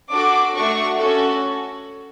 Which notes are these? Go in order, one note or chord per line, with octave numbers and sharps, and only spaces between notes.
D4 F#4 A4 D6
A3 D4 F#4 C#6
C#4 F#4 A4